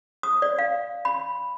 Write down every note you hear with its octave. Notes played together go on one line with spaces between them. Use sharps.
D#6
D5
F5
B5